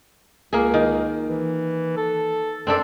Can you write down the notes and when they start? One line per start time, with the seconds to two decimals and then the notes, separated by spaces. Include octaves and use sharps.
0.53 C#2 A#3 G#4
0.74 D#3
1.28 E3
1.97 A4
2.67 F#2 C4 D4 A4